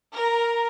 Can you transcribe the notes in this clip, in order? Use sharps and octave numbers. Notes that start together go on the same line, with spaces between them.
A#4